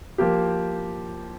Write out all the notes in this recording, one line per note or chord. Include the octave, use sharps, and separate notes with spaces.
F3 A#3 G4